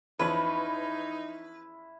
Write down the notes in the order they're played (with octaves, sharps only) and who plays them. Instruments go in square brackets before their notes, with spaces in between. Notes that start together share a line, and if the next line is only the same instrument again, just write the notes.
[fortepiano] E2 F3 C#4 [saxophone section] D#4 [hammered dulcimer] E4 [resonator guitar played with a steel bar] B4